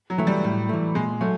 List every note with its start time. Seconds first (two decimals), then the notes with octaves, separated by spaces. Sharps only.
0.10 F#3
0.18 E3 A3
0.27 G3
0.44 A2
0.69 E3 A3
0.95 A#2 G#3
1.21 F#3 A3